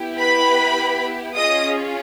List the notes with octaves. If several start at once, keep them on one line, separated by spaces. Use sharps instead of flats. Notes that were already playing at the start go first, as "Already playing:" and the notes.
Already playing: B3 E4 G4
B4 B5
C#4 F4 G#4 D#5 D#6